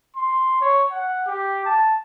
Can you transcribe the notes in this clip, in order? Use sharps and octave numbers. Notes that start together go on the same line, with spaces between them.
C6
C#5
F#5
G4
A5